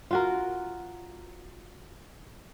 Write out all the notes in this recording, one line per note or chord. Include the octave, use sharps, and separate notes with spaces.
F4 F#4 A#4